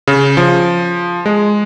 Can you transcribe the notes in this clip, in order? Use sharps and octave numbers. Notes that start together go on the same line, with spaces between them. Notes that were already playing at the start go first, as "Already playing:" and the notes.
C#3
F3
G#3